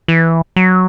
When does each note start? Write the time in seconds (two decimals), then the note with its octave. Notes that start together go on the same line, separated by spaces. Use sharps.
0.08 E3
0.56 F#3